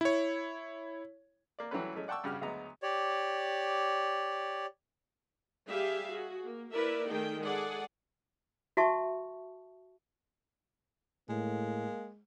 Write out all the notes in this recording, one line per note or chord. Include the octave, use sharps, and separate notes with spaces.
E4 C#5
A#3 D5
E3 F#3 G3 A3 C#4 B4
F#3 G#3 A3 C#4
D5 F#5 G5 A5 C#6 E6
G2 C#3 F#4 G4 F6
D2 F#3 G#3 B3 A#5
G4 C#5 D5
G3 G4 G#4 E5 F5
F#4 G#4
A#3
A#3 E4 A#4 B4 D5 E5
D#3 A3 D#4 G#4 G5
G#3 G#4 A4 D5 F#5
F#4 E5 A5 C#6
A2 G#3 A#3